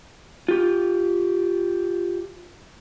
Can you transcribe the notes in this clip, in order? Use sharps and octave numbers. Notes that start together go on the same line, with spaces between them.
F4 G4